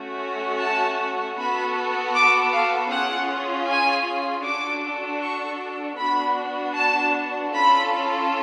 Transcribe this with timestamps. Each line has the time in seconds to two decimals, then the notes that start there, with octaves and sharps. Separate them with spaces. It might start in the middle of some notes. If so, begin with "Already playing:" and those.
Already playing: A3 C#4 F#4
0.61 A5
1.38 B3 F#4 A4 B5
2.15 D6
2.54 F5
2.91 C#4 F4 G#4 F#5
3.68 G#5
4.45 D4 F#4 A4 D6
5.21 C#6
5.99 B3 D4 F#4 B5
6.76 A5
7.52 C#4 F4 A4 B5